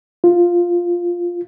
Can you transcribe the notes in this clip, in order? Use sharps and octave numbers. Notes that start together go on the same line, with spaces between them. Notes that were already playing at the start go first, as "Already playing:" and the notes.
F4